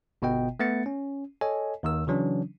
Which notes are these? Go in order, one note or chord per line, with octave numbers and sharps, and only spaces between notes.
G1 B2 B3 D#5 G5
A3 B3 A6 C#7
C#4
A4 C#5 D#5 G#5
D#2 D#3 E6
C#3 E3 F#3 C#4 D4